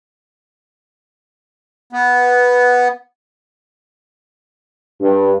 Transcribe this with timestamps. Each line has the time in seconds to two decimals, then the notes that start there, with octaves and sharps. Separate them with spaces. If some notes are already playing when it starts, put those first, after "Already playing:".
1.93 B3
5.00 G2